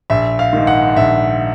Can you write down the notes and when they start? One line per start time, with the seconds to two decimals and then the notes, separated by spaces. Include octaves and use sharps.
0.10 A#1 E5
0.39 F5
0.53 G#2 D#3
0.67 F#5
0.96 A#1 E5